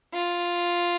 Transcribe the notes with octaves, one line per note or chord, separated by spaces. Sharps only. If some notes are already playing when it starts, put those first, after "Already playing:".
F4